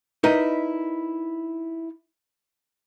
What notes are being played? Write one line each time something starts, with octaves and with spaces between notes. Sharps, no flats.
D#4 E4 A#4 B4 D5 D#5